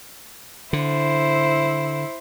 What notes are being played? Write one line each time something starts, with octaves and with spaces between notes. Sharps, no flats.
D3 E4 C5